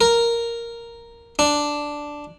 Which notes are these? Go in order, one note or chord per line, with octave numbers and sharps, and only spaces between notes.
A#4
D4